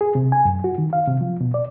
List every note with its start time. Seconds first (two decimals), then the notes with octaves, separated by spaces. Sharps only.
0.01 G#4
0.15 C3
0.32 G#5
0.45 F#2
0.64 F#4
0.78 D#3
0.93 F5
1.08 C3
1.21 F3
1.41 B2
1.54 D5